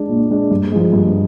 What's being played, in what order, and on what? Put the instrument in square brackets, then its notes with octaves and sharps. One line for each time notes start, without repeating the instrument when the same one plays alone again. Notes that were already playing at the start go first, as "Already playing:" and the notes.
Already playing: [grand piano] G#3 D4
A#2
G#3 D4
G2
F3 G#3
G2